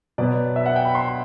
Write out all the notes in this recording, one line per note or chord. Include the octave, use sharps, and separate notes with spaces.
B2 F#3 B3 D5
E5
F#5
G5
B5
C6